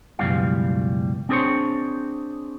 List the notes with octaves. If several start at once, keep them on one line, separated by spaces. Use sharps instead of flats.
C#2 F#2 B2 E3 G3 F5
C4 D4 G#4 A#4 C5 C#5